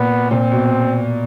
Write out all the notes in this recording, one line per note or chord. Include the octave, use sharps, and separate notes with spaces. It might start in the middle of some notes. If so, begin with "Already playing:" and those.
Already playing: A#2 B3
A#2 C4
B2